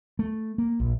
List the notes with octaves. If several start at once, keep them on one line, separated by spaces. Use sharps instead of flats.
A3
A#3
A#1